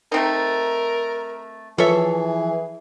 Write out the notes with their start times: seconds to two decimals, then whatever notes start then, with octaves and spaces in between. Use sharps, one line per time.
0.12 A3 C4 D#4 A#4
1.78 E3 F3 G#4 A4 C#5 E5